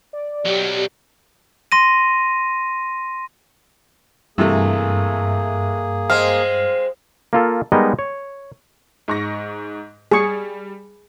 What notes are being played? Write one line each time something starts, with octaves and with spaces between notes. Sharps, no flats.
D5
B1 F#3 G4
C6 A#6 D#7
G2 C3 E3 A3 A#3 G#4
G#3 C4 F5
A#3 F4 A4
G3 G#3 B3 D#4 A#4 D#5
C#5
G#2 C#6 A#6
G3 G#4 C#6